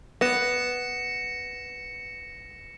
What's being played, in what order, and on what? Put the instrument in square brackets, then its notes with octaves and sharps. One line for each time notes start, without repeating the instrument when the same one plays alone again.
[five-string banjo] B3 [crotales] A#6 C#7 E7